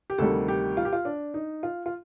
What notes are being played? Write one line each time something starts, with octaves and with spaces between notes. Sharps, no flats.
G4
D2 C3 D#3 G3 A#3 A4
G4
F4
G4
F4
D4
D#4
F4
F4